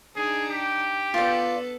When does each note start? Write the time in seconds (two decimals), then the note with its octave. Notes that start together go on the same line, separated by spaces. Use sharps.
0.16 D4 D#4 G#4
0.50 G4
1.14 B3 F4 A4 B4 D5